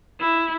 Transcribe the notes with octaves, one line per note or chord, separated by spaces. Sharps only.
E4